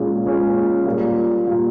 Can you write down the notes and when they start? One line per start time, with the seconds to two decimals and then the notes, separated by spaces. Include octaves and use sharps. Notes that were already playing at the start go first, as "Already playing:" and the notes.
Already playing: A#2 G#3 C#4
0.26 A#2 G#3 C#4
0.86 A#2 G3 A#3
1.47 A#2 G3 A#3